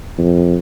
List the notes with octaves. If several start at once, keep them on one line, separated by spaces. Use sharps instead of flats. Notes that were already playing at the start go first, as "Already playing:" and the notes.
F2